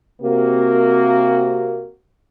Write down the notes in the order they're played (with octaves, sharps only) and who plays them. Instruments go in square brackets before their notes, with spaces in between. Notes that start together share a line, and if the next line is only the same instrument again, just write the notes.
[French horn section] C3 A#3 F#4